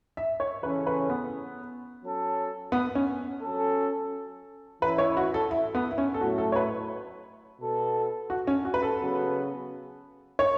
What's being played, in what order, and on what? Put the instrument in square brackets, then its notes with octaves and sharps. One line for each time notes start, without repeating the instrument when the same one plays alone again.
[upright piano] E5
C#5
[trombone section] C#3 E3 C#4 A4 [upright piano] B4
[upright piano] B4
B3
[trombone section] F#3 C#4 A4
[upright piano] B3
C#4
[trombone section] F#3 C#4 A4
[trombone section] E3 C#4 E4 [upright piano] B4
[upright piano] C#5
F#4
A4
E4
B3
E4
C#4
A4
[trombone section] A2 F#3 A3 [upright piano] F#4
[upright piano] A4
C#5
B4
[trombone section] B2 B3 A4
[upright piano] F#4
C#4
F#4
B4
A4
[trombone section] C#3 F#3 B3 F#4 B4
[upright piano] C#5